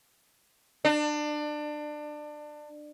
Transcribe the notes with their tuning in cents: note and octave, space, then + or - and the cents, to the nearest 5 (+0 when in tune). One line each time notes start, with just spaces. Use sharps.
D4 +25